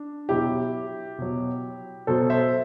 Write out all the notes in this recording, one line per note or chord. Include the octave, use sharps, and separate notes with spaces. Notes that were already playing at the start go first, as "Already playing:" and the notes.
Already playing: D4
B2 F#3 E4 G4
B2 F#3
B2 F#3 A4 C5
C5 E5